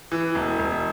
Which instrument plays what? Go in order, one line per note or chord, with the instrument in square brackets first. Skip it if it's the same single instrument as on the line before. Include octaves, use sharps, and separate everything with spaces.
[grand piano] E3
E1
E1